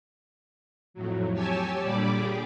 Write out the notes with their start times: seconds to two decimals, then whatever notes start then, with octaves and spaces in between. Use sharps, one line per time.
0.94 F2 A2 F#3
1.33 G4 C#5 G#5 A5 E6
1.82 A#2 D3 G3 D5 B5 D6
2.14 G4 G#4